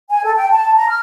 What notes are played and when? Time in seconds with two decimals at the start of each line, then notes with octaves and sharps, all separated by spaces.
0.10 G#5
0.24 A4
0.36 G5
0.50 A5
0.77 A#5
0.89 F6